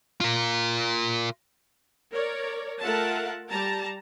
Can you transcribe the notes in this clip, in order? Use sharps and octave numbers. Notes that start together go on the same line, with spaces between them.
F4 A#4
A#4 C#5 D5
A3 F4 A#4 E5 F#5 A5
G3 A5 A#5